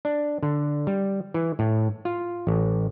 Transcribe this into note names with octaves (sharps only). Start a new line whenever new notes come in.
D4
D3
G3
E3
A2
F4
A1